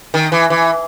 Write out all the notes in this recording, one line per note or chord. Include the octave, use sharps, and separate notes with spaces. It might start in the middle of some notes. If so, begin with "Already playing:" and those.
D#3
E3
E3